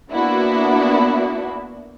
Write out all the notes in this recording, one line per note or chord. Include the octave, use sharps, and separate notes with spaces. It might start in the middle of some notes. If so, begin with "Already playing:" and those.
A#3 B3 D4 E4 F#4